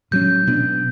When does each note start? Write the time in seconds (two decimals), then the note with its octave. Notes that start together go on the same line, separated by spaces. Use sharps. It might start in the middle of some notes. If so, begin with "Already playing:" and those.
0.11 A2 F#3 C#4 G6
0.47 B2 F#3 B3 D4